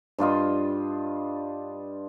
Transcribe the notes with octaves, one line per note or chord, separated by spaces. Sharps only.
G2 D4 F4 D#5